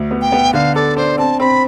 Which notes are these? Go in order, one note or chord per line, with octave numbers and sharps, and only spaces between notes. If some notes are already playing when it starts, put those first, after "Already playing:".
Already playing: D2
B3
G5
B3
D3 F5
A4 D5
D4 C5
C4 A5
C4 B5